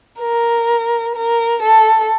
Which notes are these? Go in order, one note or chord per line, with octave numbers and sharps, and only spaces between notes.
A#4
A#4
A4